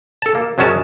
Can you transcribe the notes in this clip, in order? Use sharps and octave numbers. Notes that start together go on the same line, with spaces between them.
A4 A5
A#3
F#2 F#3 G#3 C#4 A5